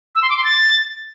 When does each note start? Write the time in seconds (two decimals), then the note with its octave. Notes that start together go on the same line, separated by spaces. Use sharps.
0.15 E6
0.23 C6
0.30 D6
0.37 C6
0.44 A6